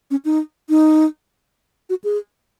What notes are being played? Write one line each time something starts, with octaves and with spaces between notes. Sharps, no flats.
C#4
D#4
D#4
F#4
G#4